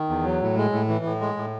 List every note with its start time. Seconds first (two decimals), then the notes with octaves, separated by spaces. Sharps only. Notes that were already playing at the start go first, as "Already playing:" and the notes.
Already playing: D#3
0.09 E2
0.25 F#3
0.42 A2
0.57 G#3
0.73 A2
0.88 E3
1.05 A2
1.21 G#3
1.37 A2